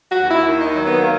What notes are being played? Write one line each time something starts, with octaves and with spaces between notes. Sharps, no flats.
F#4
D#2
E4
D#3
D#4
F#3
B3
A#3